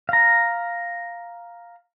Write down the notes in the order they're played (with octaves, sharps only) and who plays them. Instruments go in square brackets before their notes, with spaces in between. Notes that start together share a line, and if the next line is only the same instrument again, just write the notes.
[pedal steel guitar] F5 A#5